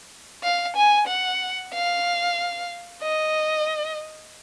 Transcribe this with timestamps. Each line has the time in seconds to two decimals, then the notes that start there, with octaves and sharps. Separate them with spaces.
0.43 F5
0.76 G#5
1.07 F#5
1.73 F5
3.02 D#5